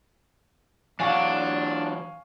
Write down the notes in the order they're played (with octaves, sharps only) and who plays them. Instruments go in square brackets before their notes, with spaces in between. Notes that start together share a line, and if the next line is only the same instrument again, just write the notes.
[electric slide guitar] E3 F#3 F#5 [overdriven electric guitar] D4 [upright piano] F5 G#5 C#6